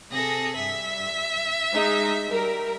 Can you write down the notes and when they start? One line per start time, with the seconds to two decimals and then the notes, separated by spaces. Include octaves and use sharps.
0.11 C3 G#4 A4 A#6
0.56 G2 E5
1.73 G#3 D#4
2.29 G3 A#4